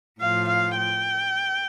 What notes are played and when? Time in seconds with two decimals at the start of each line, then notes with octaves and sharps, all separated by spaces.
0.21 A2 F3 F5
0.49 F5
0.78 G5